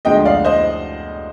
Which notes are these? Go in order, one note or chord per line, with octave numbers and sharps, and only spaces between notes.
D2 D3 F3 G#3 D#5 G5
D5 F5
C5 D#5